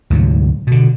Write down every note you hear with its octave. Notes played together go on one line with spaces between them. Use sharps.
D2 G#2 C3 F#3
B2 D3